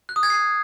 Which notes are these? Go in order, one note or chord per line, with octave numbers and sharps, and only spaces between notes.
F#6
D#6
G#6
C7